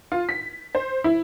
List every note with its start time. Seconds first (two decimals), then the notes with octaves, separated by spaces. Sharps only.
0.12 F4
0.29 B6
0.75 C5
1.04 E4